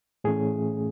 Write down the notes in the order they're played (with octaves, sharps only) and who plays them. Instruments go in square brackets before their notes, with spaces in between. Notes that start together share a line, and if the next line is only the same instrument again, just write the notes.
[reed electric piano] A2 E3 A3 C#4 G#4